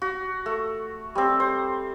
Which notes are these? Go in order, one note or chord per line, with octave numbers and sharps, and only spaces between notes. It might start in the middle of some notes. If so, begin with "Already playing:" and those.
F#4
A3
G3 C4
C5